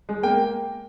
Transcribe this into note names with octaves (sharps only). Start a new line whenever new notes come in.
G#3
A#3 G5